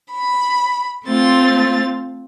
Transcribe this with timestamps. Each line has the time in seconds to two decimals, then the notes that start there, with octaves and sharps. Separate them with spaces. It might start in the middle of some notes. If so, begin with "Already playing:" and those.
0.12 B5
1.07 A3 C4 F4 A6